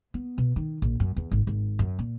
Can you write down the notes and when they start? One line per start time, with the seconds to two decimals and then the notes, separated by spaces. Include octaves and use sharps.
0.14 B3
0.38 B2
0.56 D#3
0.82 A#1
1.00 F#2
1.16 E2
1.31 G#1
1.47 G#1
1.79 F#2
1.99 A#2